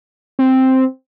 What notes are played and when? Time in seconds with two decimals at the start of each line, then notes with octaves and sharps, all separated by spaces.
0.39 C4